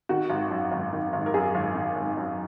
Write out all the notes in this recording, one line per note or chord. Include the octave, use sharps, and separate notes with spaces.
D#3 F#4
G#1
F#2
G#1
D#3
G#1
A#4
F#2 G#4
G#1
D#3
G#1
F#2